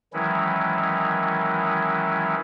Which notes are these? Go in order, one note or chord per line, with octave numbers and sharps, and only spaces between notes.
D#3 E3 F#3 G#3 C#4 E4